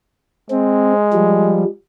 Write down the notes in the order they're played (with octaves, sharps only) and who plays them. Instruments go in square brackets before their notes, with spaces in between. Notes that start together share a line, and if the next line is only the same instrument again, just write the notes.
[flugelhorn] G#3 [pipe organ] C4
[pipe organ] F3 G3